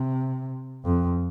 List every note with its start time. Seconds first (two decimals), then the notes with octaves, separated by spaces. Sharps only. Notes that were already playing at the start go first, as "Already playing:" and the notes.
Already playing: C3
0.85 F2